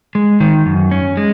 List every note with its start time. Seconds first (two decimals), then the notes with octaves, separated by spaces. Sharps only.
0.15 G#3
0.40 D#3
0.66 F#2
0.91 C#4
1.17 G#3